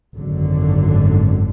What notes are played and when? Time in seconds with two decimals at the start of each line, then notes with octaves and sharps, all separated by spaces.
0.17 G#1 F#2 D3 F#3